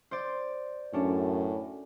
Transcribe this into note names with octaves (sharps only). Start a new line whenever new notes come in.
C5 D5
F#2 A2 C#4 D4